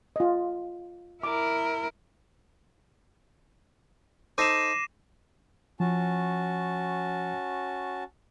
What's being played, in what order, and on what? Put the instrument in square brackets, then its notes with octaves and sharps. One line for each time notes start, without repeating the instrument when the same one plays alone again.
[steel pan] F4 D#5
[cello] E4 A#4 [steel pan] D6
[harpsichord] D#4 A4 C5 [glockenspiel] D6 A#6 C7 [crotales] D#7 E7
[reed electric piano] F3 [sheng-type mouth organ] C#4 F#4 A5